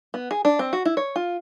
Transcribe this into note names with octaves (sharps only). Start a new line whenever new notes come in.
B3
G#4
D4
C4
F#4
E4
C#5
F4